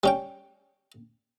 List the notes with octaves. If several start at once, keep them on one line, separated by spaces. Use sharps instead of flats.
G3 C#4 G5